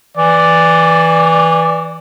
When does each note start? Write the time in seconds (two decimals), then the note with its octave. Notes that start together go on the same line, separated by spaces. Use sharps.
0.17 E3 D5